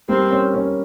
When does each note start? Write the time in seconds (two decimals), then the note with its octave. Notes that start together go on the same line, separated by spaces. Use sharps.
0.09 G3 A#3 C4
0.31 A#3 C#4
0.54 A#3 C#4